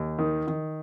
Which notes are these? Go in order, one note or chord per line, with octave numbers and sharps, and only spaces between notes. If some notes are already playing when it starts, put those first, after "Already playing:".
Already playing: D#2
D#3
D#3